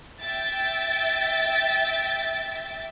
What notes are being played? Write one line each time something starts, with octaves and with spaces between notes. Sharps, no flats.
E5 G5 A6